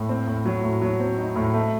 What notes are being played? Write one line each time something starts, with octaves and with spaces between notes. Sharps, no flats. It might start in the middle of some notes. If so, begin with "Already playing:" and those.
Already playing: A2
C4
A2
F#3
A2
F#3
C4
D#4
A2
A3